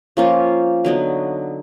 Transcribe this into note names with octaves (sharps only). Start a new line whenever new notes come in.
F3 A#3 C#4 F4
D3 F#3 B3 D#4